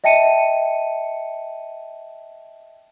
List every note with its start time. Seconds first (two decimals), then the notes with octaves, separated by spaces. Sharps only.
0.04 D#5 E5 G5 A5 C#7 D#7